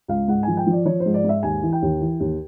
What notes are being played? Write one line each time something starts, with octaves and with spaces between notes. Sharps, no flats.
C#2 F5
G#2 F#5
F3 G#5
G5
F3
D5
F3 C#5
C5
G#2
D5
G#2 E5
D#2 G#5
E3
G5
D#2
E3
D#2